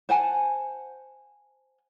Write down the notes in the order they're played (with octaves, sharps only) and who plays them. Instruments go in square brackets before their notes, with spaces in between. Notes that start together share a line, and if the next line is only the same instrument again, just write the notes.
[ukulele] C5 F#5 G#5 A5